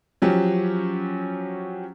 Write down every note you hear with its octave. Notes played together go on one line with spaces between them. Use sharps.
F3 F#3 C#4 G4